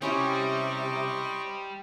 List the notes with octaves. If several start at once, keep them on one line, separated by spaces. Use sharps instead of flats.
C3 G3 C#4 E4 G4 C5 D#5 C#6